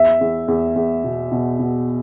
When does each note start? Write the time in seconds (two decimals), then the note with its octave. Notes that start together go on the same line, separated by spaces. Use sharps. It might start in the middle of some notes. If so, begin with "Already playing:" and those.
Already playing: E2 E5
0.21 E2
0.48 E2
0.76 E2
1.04 B2
1.32 B2
1.59 B2